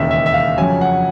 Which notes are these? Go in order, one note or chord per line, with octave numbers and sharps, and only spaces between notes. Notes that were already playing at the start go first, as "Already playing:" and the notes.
Already playing: E1 D#2 C#3 E5
E5
E5
F5
F2 C#3 F#3 G#5
F#5